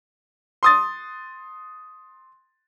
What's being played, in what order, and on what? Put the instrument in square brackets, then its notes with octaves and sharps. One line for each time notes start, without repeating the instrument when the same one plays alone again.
[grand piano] C6 D#6 A6